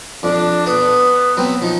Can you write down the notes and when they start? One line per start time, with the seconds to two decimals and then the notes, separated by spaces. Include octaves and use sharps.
0.23 F2 D4
0.66 B3 D4
1.37 F#3 B3 C4
1.62 F3 D#4